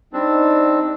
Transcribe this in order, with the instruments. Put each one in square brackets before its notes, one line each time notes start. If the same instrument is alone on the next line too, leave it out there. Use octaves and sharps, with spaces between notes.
[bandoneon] G3 C4 D4 [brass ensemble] D#4